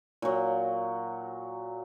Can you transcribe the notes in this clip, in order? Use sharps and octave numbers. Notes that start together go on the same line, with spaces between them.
A#2 F#3